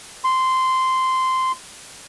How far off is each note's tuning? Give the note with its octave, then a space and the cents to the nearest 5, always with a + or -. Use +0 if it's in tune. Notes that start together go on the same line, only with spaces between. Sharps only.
C6 -10